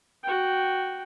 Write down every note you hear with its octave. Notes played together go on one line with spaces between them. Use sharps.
F#4 G5